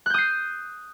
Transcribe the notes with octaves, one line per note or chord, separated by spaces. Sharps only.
D#6 F#6 G6 C7